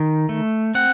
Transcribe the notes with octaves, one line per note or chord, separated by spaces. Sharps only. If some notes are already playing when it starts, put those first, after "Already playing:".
Already playing: D#3
A3
C4 F#5